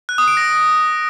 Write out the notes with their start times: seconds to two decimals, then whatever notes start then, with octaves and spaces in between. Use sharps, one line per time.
0.09 F#6
0.18 D#6
0.28 D7
0.37 A#6